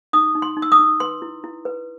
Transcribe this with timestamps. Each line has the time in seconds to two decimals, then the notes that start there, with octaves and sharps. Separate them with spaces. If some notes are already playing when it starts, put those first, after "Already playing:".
0.13 D#4 D#6
0.35 D#4
0.42 C6
0.57 D#4
0.62 E6
0.72 D#6
0.79 D#4
1.00 B4 C6
1.22 E4
1.44 E4
1.65 B4